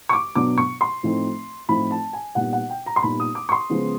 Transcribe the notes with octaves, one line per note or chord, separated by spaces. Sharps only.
C#6
D6
B2 F#3 B3 D4 D6
C#6
C6
A2 F3 A3 C4 D#4
A2 F3 A3 C4 D#4 B5
A5
G#5
A#2 G3 B3 D#4 F#5
F#5
G5
A#5
C6
A#2 G3 B3 D#4 B5
D#6
D6
C#6
C6
C#3 F3 G#3 B3